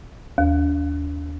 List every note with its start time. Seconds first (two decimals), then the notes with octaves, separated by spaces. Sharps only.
0.38 D#2